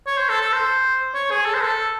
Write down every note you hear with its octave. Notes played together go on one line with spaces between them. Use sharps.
C#5
C5
A4
A4
C5
C#5
G#4
A4
C5
A4